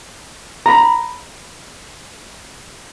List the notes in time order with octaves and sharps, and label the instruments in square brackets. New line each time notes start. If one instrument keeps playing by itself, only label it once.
[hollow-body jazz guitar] A#5 B5